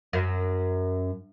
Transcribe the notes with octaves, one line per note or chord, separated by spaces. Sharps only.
F#2